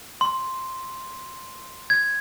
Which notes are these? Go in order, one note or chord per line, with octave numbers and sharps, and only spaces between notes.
C6
G#6